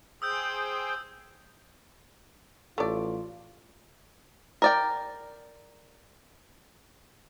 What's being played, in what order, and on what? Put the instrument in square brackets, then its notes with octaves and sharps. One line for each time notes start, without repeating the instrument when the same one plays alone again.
[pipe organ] G#4 C5 G5 [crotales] D#6 E6 G6
[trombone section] A1 [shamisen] A3 D5 [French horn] F4
[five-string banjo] A#4 D5 G5